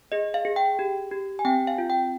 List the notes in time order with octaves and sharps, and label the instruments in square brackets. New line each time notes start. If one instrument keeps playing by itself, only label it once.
[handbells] G#4 D#5
F5
G#4
G5
G4
G4
G#5
C4 G5
F5
F4
G5